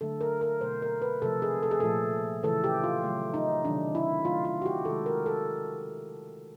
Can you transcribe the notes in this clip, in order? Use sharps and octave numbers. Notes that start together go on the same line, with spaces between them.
D3 F#3 A3 A4
A#4
A#4
B2 F#3 A3 C5
A#4
B4
C3 F3 A3 A4
G#4
A4
G#4
A#2 F3 A3 A4
C#3 E3 A3 A4
G4
F4
C#3 F#3 A3
D#4
C3 D#3 F#3 D4
E4
D#3 F#3 A3 F4
F4
F#4
G4
C3 D#3 G#3 A4
A#4
A4